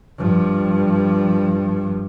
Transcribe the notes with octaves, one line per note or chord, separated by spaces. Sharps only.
G2 F3